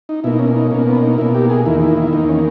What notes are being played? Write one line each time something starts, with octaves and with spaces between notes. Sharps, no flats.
D#4
B2 A#3 E4
D#4
C#4
D#4
B2 A#3 C#4
B3
C#4
D#4
B2 A#3 E4
G4
G#4
E2 D#3 A#3 E4
E4
E4
E4
E2 D#3 A#3 D#4
C#4